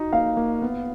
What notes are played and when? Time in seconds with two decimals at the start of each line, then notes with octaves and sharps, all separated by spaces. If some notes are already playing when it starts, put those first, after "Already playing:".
Already playing: D#4 F#4
0.13 A#3 F5
0.37 A#3
0.62 B3